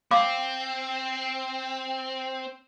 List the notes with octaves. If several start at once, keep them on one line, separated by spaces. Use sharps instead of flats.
C4 F5 D6